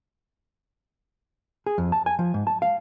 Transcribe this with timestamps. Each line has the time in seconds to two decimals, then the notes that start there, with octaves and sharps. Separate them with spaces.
1.66 G#4
1.78 F2
1.92 A5
2.06 G#5
2.19 F3
2.34 G#2
2.47 A5
2.62 F5